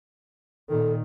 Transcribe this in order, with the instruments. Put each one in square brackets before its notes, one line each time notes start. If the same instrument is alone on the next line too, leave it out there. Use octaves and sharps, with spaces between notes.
[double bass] A#2 D#3 [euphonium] A4